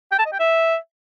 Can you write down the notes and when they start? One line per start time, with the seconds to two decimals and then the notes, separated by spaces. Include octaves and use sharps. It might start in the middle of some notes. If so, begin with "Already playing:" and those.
0.12 G5
0.19 A5
0.26 D#5
0.33 G5
0.39 E5